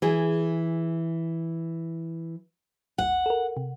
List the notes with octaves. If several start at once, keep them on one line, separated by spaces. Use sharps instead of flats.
E3 G#4
A1 D#2 F#5
A4 A#4
C3